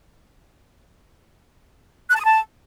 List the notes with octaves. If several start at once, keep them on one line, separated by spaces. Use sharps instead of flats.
F#6
A5
D#6
A5